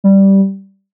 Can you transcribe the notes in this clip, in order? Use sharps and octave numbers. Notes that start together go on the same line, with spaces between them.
G3